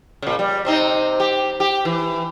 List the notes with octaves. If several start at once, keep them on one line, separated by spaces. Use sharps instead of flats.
A#2 C#3
G3
C3 C4 D#4
G4
G4
E3